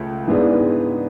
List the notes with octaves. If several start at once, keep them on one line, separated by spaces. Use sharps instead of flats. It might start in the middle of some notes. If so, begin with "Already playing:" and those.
Already playing: C#2 A3
G#2 E3 G#3 B3 D4